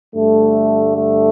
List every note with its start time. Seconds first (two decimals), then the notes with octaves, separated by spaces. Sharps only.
0.14 G2 D3 A3
0.96 A3